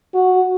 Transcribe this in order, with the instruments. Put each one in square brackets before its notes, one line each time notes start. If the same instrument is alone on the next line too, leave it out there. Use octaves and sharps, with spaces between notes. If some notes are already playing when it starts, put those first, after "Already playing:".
[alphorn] F#4